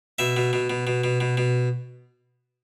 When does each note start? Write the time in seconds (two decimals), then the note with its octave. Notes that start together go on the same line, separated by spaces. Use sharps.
0.18 B2 E5
0.37 B2
0.53 B2
0.70 B2
0.87 B2
1.04 B2
1.20 B2
1.37 B2